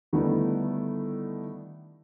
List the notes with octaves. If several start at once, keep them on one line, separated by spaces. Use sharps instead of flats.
D3 D#3 G3 A3 B3 E4